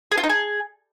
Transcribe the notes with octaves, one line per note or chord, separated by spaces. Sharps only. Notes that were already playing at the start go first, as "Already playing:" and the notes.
G#4
F4
D#4
G#4